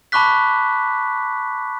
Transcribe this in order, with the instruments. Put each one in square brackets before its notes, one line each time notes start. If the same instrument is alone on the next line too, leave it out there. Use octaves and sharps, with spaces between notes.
[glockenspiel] A5 B5 C#6 D6 F#6 B6